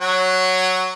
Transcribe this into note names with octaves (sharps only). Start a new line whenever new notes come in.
F#3 C#5 F#5